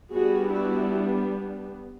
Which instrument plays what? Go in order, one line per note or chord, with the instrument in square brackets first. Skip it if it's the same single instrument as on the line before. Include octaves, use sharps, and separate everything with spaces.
[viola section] G3 B3 D4 F#4 G#4
E4 F#4